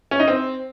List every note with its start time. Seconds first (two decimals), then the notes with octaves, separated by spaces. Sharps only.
0.11 C#4
0.19 D#4
0.28 C4